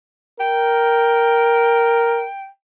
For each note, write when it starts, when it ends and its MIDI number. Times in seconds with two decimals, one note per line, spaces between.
0.40 2.27 70
0.40 2.47 79